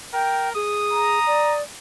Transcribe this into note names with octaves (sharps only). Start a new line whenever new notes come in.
A#4 G5
G#4 D#6
A#5
D5